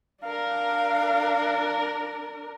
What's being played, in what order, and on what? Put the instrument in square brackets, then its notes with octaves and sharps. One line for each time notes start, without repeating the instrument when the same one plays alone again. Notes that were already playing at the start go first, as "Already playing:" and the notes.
[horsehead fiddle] D4 A#4 [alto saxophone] F5